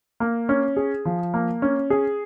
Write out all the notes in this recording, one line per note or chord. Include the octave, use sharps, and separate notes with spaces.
A#3
C#4
G#4
F3
A#3
C#4
G#4